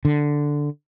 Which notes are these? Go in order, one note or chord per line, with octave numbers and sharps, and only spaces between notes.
D3